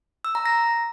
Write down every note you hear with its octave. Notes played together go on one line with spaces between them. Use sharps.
E6
A#5
A#6